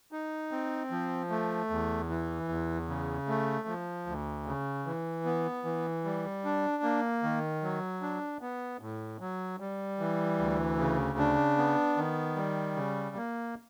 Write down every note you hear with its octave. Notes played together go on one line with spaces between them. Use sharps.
D#4
C4
F3
A3
E2
E3
E2
C#3
A3
F3
D2
C#3
E3
B3
E3
G3
D4
A#3
D#3
F#3
D4
B3
A2
F#3
G3
E3
D2
C#3
D4
B3
D#3
G3
C#3
A#3